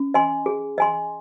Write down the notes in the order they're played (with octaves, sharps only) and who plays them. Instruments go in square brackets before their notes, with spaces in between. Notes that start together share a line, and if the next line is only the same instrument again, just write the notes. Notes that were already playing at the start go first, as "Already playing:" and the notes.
Already playing: [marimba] C#4
[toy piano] D#5 G#5 C6
G#4
D#5 G#5 C6